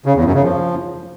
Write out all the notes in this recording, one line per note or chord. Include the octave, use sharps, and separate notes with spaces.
C#3
E2
F#2
C#3
F3